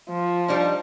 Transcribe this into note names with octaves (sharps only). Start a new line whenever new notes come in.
F3
G3 D4 D#4